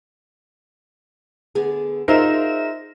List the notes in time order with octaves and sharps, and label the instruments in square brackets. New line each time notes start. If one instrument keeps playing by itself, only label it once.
[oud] D3 B3 G#4
[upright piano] D#4 A#4 [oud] F4 G#4 [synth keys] C5 E5 E7